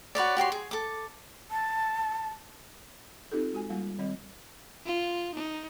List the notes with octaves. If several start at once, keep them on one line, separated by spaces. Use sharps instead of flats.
F#4 B4 C#5 D5
F#4 G4 C#5 C6
G#4
A4 D6
A5
C4 D#4 F4 G4 A4
G#3 F#4 G#5
G3 A#3 F4 F5
D#3 G3 C4 D#5
F4
D#4